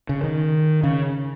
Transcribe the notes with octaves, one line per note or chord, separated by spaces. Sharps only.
C#3
D#3
C#3